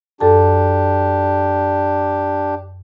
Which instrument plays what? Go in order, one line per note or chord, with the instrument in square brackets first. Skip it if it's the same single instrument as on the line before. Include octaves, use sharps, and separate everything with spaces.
[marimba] F#2 A4 A5 [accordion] D4 G4